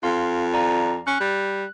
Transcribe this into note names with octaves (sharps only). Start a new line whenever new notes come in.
F2 F5 C6
D5 F5 A#5
C#4 F#6
G3